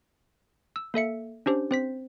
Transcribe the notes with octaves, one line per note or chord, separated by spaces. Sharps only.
E6
A#3 A4 E5 C#7
C#4 D4 G4 C5
C4 C5 B6